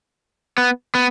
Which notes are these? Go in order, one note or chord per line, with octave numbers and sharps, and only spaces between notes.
B3
B3